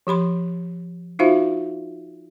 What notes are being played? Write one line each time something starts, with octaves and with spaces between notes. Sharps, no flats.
F3 G4 B5 C6
D#4 F4 F#4 C5 E5 F5